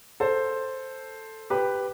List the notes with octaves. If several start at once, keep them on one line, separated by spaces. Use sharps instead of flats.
A4 C5
G4 B4